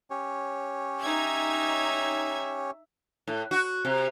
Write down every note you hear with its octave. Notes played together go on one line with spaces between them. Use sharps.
C#4 G4 C#5
D#4 E5 G#6
A2
F#4
C3